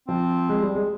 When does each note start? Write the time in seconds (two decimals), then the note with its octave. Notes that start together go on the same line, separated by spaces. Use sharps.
0.08 F3 C4
0.49 G#3
0.62 G3
0.75 G#3